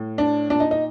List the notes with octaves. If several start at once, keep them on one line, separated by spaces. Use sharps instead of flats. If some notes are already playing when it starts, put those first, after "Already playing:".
Already playing: A2
D4
A#2 D4
D#4
D#4